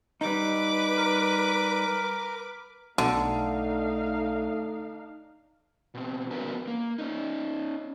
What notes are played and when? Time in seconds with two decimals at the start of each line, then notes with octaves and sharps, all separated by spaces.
0.21 G3 D#4 B4 D6
0.97 A#4
2.98 B1 D3 A3 D4 D#4 F5
5.95 B2 C4
6.31 B3 C#4 D4 F#4 A#4 B4
6.68 A#3
6.98 C#4 D#4